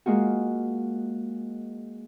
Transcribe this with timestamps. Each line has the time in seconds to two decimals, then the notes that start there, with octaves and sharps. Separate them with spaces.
0.06 G#3 A#3 F4 F#4